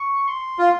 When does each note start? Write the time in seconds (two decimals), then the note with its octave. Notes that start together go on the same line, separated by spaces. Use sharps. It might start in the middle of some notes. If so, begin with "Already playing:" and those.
Already playing: C#6
0.28 C6
0.59 F4